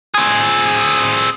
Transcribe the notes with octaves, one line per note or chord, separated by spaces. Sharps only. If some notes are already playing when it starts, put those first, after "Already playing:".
C4 G#4